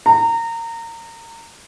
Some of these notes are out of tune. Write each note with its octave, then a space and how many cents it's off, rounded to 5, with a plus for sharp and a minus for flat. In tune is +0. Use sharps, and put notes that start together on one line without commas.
A#5 -25